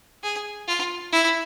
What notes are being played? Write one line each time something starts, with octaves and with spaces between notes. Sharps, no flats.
G#4
F4
E4